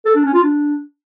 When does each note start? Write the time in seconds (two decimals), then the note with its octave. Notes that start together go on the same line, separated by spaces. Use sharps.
0.06 A4
0.15 D4
0.25 C#4
0.34 F4
0.44 D4